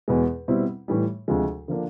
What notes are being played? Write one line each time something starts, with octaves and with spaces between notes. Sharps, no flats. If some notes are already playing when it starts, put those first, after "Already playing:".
E2 B2 G#3
B2 G3 C4 E4
A2 E3 G3
D2 C3 F3 G#3
D3 F3 A#3 D4